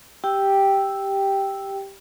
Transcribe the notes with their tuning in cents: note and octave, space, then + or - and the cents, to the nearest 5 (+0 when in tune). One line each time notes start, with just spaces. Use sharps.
G4 +0 G5 +0 E6 +0